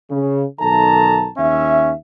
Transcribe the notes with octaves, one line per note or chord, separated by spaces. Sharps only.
C#3
B1 D#3 A4 A5 A#5
D#2 C#4 E5